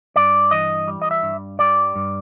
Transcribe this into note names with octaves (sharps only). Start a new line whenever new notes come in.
G2 D5
E3 D#5
G3
D#5
E5
G2
G3 D5
G2